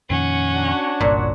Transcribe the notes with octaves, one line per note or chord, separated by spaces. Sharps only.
F2 A#2 D#3 C#4 F#5
D4 F#4 C#5
G1 C2 G2 A#2